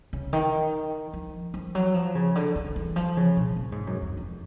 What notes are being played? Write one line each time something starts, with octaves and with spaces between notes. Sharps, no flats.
C#3
D#3
F3
F3
F#3
F3
C#3
D3
D3
E3
F3
C#3
B2
A#2
G#2
F#2
F2
F2